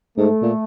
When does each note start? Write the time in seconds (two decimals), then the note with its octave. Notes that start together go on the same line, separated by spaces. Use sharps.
0.17 G#2 A3
0.42 A#2